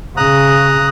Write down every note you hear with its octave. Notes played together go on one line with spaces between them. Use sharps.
C#3 A#5 D#6 F#6